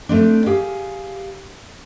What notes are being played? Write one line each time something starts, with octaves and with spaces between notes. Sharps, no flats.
A3 C4 D4
G4 G#4 F5